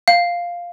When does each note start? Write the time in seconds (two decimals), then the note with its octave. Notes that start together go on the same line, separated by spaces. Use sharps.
0.08 F5